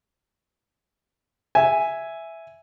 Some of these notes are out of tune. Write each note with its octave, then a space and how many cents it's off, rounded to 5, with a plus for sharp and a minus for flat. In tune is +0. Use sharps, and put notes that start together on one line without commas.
E5 +0 G#5 +0